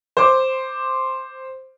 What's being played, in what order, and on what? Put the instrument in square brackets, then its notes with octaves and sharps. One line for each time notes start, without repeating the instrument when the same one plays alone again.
[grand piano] C5 D6